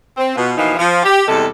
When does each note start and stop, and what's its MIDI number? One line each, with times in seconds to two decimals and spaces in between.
0.17 0.33 60
0.36 0.52 47
0.36 0.52 65
0.58 0.74 47
0.58 0.74 52
0.58 0.74 53
0.58 0.74 58
0.58 0.74 63
0.58 0.74 77
0.77 1.00 53
0.77 1.00 65
1.03 1.22 67
1.28 1.47 40
1.28 1.47 48
1.28 1.47 55
1.28 1.47 56
1.28 1.47 69